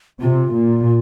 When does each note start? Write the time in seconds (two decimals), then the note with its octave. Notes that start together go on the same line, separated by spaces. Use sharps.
0.21 C3 F4
0.52 A#2